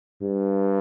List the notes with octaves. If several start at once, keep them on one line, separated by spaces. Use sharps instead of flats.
G2